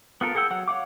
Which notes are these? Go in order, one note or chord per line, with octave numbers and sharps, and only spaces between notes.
B3 F4 A4 A#4
G#4 A#4 F#5 G5 E6
F#3 F#5
C#5 F5 F#5 D6